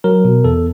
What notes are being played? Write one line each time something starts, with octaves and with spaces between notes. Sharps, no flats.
F#3 A#4
B2
E2 A4